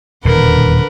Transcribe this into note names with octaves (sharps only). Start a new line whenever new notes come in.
D#1 E2 B2 D3 A#4 B4